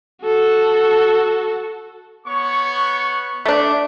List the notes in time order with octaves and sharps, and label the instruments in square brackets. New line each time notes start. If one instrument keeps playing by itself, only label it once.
[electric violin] F#4 A4
[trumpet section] B3 C#5 C#6
[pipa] A3 D4